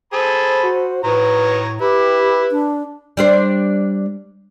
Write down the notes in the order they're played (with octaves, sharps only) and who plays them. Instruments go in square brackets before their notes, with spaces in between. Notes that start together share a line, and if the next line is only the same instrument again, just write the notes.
[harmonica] G#4 A4 B5 [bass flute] C5
[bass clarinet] F#4
[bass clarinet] A2 [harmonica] D#3 C#5 A#5 [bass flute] B4
[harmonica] E4 [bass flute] G4 [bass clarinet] B4
[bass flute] D4
[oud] G3 D4 C5